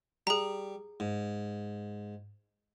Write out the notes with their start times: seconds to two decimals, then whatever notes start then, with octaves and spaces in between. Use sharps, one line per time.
0.27 G3 G#4 A#5
1.00 G#2